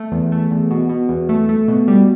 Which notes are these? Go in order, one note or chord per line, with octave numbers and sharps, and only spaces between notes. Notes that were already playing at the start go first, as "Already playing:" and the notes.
Already playing: A3
E2
A3
E2
B2
B2
E2
A3
A3
B2
G3